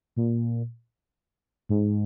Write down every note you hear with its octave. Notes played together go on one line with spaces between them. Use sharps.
A#2
G#2